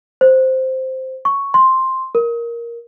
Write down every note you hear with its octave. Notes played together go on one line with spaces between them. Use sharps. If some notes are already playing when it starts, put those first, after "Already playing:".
C5
C#6
C6
A#4